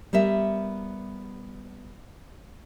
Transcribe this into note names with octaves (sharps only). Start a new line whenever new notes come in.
G3 B3 A#4 E5